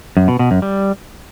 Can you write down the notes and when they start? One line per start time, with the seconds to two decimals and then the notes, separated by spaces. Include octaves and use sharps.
0.17 F#2
0.28 B2
0.39 B2
0.51 F#2
0.62 G3